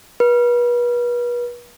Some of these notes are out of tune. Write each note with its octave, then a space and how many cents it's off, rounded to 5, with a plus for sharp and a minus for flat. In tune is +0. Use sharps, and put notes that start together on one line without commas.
B4 -35